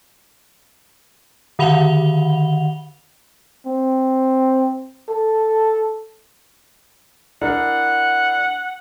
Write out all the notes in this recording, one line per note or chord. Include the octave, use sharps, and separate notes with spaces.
D3 D#3 F#5 B5 F7 G7
C4
A4
D4 E4 A#4 F#5